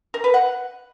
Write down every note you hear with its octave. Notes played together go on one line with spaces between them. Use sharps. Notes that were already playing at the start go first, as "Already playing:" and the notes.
A#4
B4
F#5